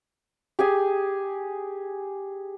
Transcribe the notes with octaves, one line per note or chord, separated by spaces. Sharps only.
G4 G#4 G#5